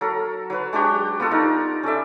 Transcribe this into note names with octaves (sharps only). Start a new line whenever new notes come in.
F#3 A4 A#4
F#3 B4
G#3 D4 F#4 G4
B3 F4 F#4 A4
G3 D#4 A#4
C#4 A4 D5 E5